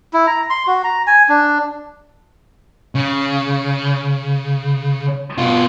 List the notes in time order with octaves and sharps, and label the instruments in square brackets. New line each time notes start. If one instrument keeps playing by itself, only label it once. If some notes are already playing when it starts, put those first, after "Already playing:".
[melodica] E4
A#5
C6
F#4
A#5
G#5
D4
[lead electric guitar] C#3
B2 F4